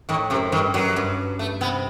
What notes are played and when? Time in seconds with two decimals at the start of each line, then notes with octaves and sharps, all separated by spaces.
0.09 A2 D#3
0.30 F#2 C3
0.52 G2 D#3
0.74 F#2 F#3
0.96 G2
1.39 A3
1.61 C3 B3